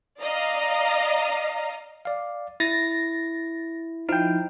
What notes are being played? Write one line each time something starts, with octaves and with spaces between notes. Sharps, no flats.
D5 D#5 F5 A#5
D5 F5
E4 A6 A#6
F3 D#4 E4 G5 F6